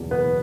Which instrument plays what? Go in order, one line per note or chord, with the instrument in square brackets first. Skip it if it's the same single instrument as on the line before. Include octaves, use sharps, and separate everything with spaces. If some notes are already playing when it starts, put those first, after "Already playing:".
Already playing: [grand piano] F#1 E2 B2
B3